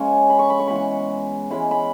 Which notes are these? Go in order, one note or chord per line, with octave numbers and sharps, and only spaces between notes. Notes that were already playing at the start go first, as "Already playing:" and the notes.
Already playing: C#3 G#3 C#4 C#6
B5
C#6
B5
C#6
E3 G#3 B3 B5
C#6
E3 G#3 C#4 B5
B5